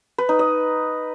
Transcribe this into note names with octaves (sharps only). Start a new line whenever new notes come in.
B4
D#4
D#5